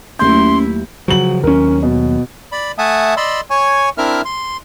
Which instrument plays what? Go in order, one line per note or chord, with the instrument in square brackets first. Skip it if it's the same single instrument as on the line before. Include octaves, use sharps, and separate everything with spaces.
[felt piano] D#2 G6 [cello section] F#3 A3 E4 [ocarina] C#4 [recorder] C6
[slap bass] C#3 F3 [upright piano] F#3 F#7
[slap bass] D#2 F#3 [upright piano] C#4 A#4
[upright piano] B2
[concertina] D5 B5
A3 E5 F#5 G#5 A5 D#6
D5 D#5 B5 C6 E6
C#5 G#5 C#6
C4 D4 E4 A#4 E5 F6
C6